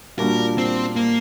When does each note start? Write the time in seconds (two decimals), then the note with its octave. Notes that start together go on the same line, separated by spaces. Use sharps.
0.19 A#2 G3 D4 F#4 A#4
0.58 C4
0.96 A#3